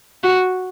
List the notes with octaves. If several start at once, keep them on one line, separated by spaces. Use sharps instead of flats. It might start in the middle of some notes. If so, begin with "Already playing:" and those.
F#4